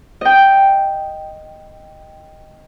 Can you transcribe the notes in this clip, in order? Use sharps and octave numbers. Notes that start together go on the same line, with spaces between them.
D#5 G5